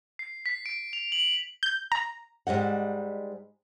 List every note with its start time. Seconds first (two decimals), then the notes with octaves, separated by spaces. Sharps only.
0.19 C7
0.46 B6
0.66 D7
0.93 F7
1.12 F#7
1.63 G6
1.92 A#5
2.47 G#2 G3 D#5 F#5